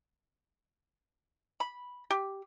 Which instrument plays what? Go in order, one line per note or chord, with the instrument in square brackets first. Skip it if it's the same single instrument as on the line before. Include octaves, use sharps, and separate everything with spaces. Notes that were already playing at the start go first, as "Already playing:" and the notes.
[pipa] B5
G4